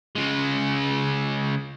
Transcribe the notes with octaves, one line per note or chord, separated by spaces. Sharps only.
C#3 G#3